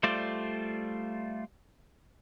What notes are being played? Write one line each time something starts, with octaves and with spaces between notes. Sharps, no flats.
G3 A3 F4 C5 D5